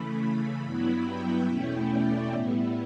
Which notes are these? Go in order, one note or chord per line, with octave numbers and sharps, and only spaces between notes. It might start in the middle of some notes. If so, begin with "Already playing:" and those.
Already playing: C#3 E3 A3 B5
G2 F#3 B3 E4
G5
E2 B2 A3 C#4 E4
D5
A2 G3 B3 E4